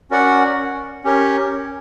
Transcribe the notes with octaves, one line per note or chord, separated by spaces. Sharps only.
C#4 F#4 A#4 D5 F#5
C#4 G4 A#4 C#5